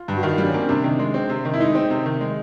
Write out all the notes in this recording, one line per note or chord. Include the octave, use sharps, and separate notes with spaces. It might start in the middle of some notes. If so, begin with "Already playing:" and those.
Already playing: F4
G2
F#4
D#3 F4
G3 D4
C#4
A#3 C4
C3 D4
D#3
G#3
C4
C3
D#3
E4
G#3 D#4
C4
C3
D#3
G#3